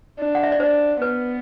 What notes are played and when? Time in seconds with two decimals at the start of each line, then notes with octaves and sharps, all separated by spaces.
0.19 D4
0.35 F#5
0.43 E5
0.52 D5
0.60 D4 C5
1.01 B3 B4